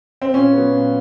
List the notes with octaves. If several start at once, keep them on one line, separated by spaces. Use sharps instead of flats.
C4
A#2 C#4
F#3 B3
A#2